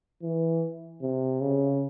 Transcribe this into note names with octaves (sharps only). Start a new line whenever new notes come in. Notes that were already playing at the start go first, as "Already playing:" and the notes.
E3
C3
C#3